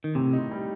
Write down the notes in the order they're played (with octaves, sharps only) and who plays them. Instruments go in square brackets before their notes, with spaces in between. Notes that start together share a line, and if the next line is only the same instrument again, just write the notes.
[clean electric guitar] D#3
[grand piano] A2 [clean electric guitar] C3
[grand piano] D#4
G3